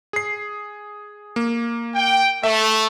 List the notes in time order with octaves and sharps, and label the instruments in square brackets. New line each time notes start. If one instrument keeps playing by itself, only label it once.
[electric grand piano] G#4 C7
A#3
[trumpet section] G5
[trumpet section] A3 [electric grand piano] E5